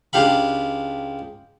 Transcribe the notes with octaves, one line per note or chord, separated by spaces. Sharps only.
C#2 D4 G4 F5 B5